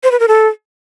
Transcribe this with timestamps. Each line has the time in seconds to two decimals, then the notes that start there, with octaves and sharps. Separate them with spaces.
0.03 C5
0.12 B4
0.20 A#4
0.28 A4